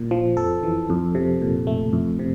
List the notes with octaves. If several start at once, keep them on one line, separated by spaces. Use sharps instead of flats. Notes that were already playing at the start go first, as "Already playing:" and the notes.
Already playing: A#2
F3
F2 A4
E3
F2
C3
A#2
A3
F2
C3